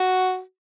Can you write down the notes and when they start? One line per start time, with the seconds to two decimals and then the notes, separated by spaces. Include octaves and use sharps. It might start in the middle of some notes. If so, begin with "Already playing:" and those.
Already playing: F#4